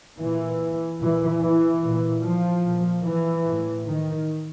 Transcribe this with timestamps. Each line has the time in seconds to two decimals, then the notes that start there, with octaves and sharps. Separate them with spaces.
0.20 A#2 E3
1.01 A#2 E3
1.43 E3
1.84 A#2
2.24 F3
2.66 A#2
3.06 E3
3.47 A2
3.88 D#3